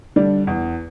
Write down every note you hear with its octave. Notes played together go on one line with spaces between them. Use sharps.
D3 G3 D4
E2